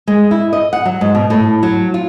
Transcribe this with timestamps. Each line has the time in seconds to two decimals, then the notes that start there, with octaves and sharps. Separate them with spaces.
0.08 G#3
0.31 E4
0.53 D#5
0.73 F#5
0.85 F#3
1.01 G#2
1.15 B2
1.30 A2
1.63 F#3
1.94 F4